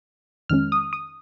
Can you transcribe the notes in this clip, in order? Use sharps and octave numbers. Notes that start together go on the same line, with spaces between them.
F2 D#3 G#3 C#4 F6
D#6
D#6